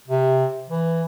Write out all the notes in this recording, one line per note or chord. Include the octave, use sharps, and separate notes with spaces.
C3
E3